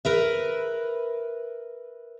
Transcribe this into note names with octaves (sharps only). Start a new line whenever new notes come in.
A#4 B4 E5